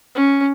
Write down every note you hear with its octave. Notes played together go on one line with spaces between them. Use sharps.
C#4